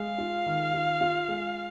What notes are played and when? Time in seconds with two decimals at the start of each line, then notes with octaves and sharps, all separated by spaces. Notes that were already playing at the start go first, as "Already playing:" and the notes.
Already playing: G#3 F5
0.18 F4
0.46 D#3
0.74 F4
1.01 F4
1.28 G#3